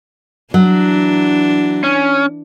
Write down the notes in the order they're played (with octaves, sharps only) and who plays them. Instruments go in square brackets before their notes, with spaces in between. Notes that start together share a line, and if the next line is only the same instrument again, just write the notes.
[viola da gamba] E3 D4 [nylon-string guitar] F#3
[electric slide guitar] C#4